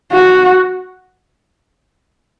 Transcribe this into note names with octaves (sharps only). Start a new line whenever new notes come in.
F#4